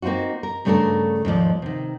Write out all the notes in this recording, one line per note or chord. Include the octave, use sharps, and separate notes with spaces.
A#3 C4 D#4 F4 F#4
A#4
G2 C#3 A3 D4 A4 A#4
D#2 G#2 F3 D5
C3 D#3